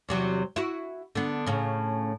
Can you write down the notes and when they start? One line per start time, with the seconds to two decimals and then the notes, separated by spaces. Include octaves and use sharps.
0.09 E2 C3 F#3
0.56 E4 F#4
1.15 D3 B3
1.46 A2 C#3